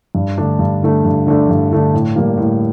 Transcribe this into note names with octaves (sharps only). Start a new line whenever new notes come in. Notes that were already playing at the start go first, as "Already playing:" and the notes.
G2
D3 A3 D4
G2
D3 A3 D4
G2
D3 A3 D4
G2
D3 A3 D4
A2
G3 A#3
A2